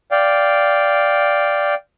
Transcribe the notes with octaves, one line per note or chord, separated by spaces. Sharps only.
D5 F5 G5